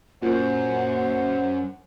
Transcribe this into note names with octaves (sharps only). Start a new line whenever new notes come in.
F#2 A#2 C5 F#5